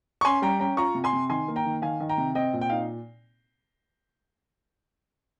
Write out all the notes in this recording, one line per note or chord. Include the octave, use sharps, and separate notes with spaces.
C#6
C#4 G#5 C6
G3 G5 A#5
C#4 G5 A#5
F4 A#5 C#6
C3
G#5 C6
C3
D#3 G#5 C6
A#3
G5 A#5
D#3
D#3 F5 G#5
D#3
G5 A#5
C3
C4 D#5 G5
A#2
G5
D#4 F5